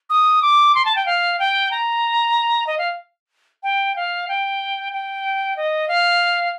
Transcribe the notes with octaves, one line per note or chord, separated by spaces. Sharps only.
D#6
D6
C6
A5
G5
F5
G5
A#5
D#5
F5
G5
F5
G5
G5
D#5
F5